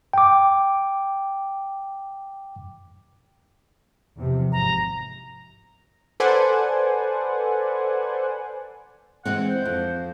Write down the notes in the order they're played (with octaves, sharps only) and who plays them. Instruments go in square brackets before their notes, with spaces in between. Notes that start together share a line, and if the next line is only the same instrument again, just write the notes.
[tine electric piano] G5 D6
[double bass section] E2 C3 F3
[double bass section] G#1 [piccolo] A#5
[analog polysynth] A4 B4 C5 D5 F#5 G#5
[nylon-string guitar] E3 G#3 C4 [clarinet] F#5
[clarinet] C5
[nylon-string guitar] F2